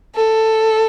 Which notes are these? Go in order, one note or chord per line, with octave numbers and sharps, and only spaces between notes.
A4